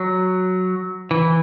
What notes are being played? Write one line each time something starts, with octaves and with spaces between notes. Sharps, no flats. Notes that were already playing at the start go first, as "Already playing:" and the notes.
Already playing: F#3
E3